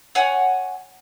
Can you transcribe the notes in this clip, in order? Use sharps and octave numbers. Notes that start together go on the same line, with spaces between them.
C#5 F#5 G#5